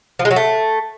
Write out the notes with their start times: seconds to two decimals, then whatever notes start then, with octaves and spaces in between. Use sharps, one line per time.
0.19 F3
0.25 G#3
0.31 F#3
0.36 A3